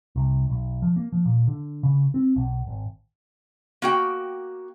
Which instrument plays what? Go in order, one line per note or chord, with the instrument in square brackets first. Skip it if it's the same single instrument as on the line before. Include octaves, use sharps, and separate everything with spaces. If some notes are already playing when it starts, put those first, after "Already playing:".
[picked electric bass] C2
B1
F3
A#3
F3
A#2
D3
C#3
C4
B1
G#1
[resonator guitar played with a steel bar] A#3 F#4 G5